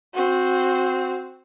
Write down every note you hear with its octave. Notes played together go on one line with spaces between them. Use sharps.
C4 F#4